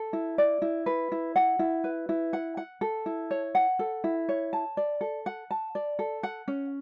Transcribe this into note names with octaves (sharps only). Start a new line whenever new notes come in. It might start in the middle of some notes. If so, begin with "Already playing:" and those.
Already playing: A4
E4
D5
E4
B4
E4
F#5
E4
B4
E4
F#5
F#5
A4
E4
C#5
F#5
A4
E4
C#5
A5
D5
A4
F#5
A5
D5
A4
F#5
C#4